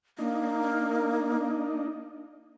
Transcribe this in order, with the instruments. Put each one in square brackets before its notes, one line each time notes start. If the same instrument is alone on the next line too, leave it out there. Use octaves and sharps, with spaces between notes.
[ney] A#3 [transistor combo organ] D4 D#4